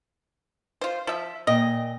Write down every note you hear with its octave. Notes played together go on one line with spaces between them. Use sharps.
F4 C5
F3 E5
A#2 D#5 G5